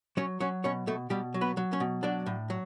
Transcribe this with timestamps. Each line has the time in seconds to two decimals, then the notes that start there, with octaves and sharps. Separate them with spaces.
0.17 F#3 C#4 C#5
0.40 F#3 C#4 C#5
0.64 B2 C#4 C#5
0.87 B2 A3 A4
1.10 B2 G3 G4
1.34 F#3
1.41 B3 B4
1.57 F#3
1.73 C#4 C#5
1.80 B2
2.03 F#3 D4 D5
2.26 A2
2.50 F#3